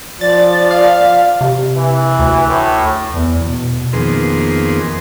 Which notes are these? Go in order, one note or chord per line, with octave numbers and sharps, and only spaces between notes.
F3 D5 A6
F5
C3
E3
D2
A2
E2
B2
F2 D#3 A#3 B3 G#4 C6